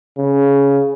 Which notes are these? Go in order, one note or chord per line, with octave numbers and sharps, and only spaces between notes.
C#3